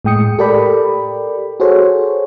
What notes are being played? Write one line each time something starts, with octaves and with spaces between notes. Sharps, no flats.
A2 G#3 G5 D#6 C#7
G4 A4 A#4 D5 G5 B5
F#4 G#4 A4 C5 C#5